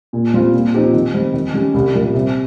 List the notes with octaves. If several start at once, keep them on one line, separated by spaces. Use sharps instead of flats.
A#2
G3 C4 F4
A#2
F3 C4 D#4 G4
D#3
G3 C4
D#3
G3 C#4 G4
C2
A#2 G3 A#3
C3